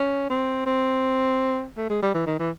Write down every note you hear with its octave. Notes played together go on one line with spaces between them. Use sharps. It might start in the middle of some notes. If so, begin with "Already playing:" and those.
Already playing: C#4
C4
C4
A3
G#3
G3
E3
D#3
E3